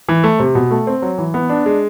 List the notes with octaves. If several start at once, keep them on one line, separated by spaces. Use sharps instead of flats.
E3
A3
C3
B2
A3
C4
F#3
E3
B3
D4
G#3